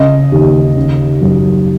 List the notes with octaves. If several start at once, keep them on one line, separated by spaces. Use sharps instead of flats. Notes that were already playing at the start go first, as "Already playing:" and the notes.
Already playing: C#3 D#5
D#2
C#3
F#2